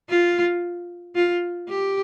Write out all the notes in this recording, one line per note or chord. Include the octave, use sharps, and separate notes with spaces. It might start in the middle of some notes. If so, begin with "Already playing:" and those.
F4
F4
G4